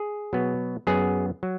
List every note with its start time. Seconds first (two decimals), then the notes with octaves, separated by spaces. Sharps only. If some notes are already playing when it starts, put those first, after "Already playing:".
Already playing: G#4
0.33 B2 F#3 B3
0.87 F#2 F#3 B3 G#4
1.43 F#3